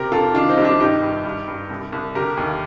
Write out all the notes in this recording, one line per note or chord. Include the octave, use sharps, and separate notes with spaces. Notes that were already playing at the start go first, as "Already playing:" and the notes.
Already playing: C3 G4 A#4
F2 F4 A4
D#3 D4 F4
C4 D#4
C2 G4
D4 F4
G2 D#4 G4
G2
G2
G2
C2
C2
D3 G4 A#4
D#2